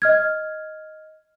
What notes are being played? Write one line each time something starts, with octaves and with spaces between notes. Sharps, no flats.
D#5 F6 G#6